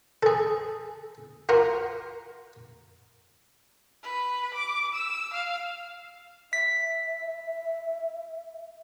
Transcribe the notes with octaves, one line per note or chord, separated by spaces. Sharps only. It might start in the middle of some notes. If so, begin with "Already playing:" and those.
G#4 A4
F4 F#4 A#4
B4
D6
E6
F5
E5 B6